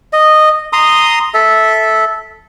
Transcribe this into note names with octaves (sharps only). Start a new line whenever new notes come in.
D#5
A#5 C6 D#6
A4 E5